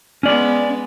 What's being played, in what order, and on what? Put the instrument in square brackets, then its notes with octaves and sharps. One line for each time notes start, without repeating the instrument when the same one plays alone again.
[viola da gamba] G#3 B3 [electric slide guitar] C#4 D5